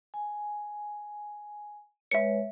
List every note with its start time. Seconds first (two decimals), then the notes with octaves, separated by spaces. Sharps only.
0.14 G#5
2.11 G#3 B4 C#5 E5 C#7